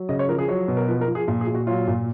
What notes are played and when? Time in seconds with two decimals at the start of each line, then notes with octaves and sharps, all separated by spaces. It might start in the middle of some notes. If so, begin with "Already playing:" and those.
Already playing: F#3
0.09 C#3 D#5
0.19 C#5
0.29 F3 A#4
0.39 G#4
0.48 F#3 C#5
0.68 B2
0.77 A#4
0.88 F3 B4
1.01 A#4
1.08 F3
1.15 G#4
1.28 A#2
1.41 G#4
1.48 A#2
1.55 F#4
1.67 F#3 F4
1.88 A#2